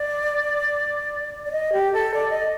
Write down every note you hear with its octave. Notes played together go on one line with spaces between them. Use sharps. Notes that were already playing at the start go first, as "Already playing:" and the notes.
Already playing: D5
D5
D#5
G4
A4
D5
D#5